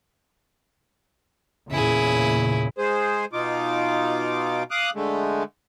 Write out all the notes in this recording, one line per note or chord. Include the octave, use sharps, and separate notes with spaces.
E2 A#2 C#3 E4 G#4
G#3 G#4 C5
B2 D#4 F4 D6
F5 D6 D#6 F#6
D3 G#3 A3